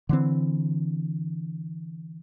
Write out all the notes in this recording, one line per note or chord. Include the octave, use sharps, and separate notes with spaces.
D3 E3 C4